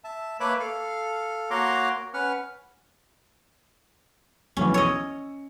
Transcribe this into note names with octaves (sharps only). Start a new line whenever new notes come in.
E5 A5
A#3 B4 C#5 E5 B5 D6
A4 F5
A#3 F#4 C#5 A#5 C6 D6
C#4 B4 F#5 F6
B1 E3 C#4
C#5 D#5 E6 C#7